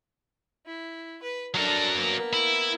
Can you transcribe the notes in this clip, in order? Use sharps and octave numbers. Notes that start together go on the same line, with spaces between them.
E4
B4
F#3 D4 A4 A#4
A#3 B3
E4